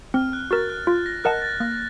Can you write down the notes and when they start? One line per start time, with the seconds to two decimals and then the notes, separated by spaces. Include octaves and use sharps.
0.14 C4 F6
0.33 F#6
0.51 F#4 A#4 A6
0.69 F#6
0.87 F4
1.06 A#6
1.24 A#4 D#5 F#5 A5 F#6
1.42 A6
1.60 A#3 A#6